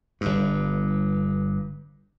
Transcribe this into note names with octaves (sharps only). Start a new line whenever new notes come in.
G1 G2